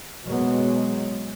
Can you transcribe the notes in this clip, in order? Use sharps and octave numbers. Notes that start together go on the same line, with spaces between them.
B2 F#3 G#3 B3